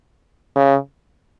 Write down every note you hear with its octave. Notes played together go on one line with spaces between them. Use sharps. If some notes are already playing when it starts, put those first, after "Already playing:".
C#3